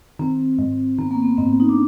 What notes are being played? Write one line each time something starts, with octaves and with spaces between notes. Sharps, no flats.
D#3 C4
G#2
D#3 B3
A#3
B3
G#2 C4
D#4
D4